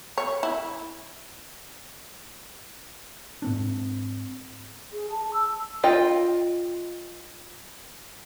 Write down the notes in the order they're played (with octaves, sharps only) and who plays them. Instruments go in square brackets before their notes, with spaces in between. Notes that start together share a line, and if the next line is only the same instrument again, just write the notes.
[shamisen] C#5
E4
[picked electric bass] G#2 C4 D4
[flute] G#4
A5
E6
[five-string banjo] F4 D#5 G5